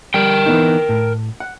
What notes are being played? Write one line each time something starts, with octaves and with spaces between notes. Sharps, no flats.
G3 A#4 G5
E3 B3 D#4
A2
F#5